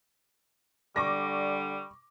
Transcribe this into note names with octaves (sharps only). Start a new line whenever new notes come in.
D3 G3 C#6 D6 A#6